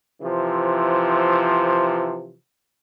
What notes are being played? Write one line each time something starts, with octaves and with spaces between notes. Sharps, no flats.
C3 E3 F3